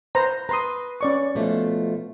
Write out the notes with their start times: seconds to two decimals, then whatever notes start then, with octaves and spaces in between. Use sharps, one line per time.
0.15 B4 C5 A#5
0.49 B4 A#5 C6 D#6
1.01 C#4 D5 C#6
1.35 B2 F3 A3